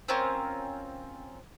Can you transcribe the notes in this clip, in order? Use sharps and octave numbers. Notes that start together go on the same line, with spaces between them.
C4 C#4 F4 A#4